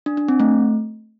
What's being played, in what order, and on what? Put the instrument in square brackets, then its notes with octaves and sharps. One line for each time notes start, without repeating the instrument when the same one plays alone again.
[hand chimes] D4
D4
C4
A3